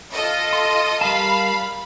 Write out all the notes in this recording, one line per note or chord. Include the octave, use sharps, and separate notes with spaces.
F4 A4 D#5
C6
G3 A#4 F5 A5 B5